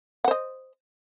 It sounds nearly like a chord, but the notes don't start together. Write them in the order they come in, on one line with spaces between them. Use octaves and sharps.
F#5 C5 D#5